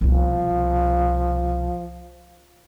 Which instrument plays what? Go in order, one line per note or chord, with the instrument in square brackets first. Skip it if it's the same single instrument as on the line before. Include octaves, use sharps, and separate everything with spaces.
[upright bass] C2 B2 [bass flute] F3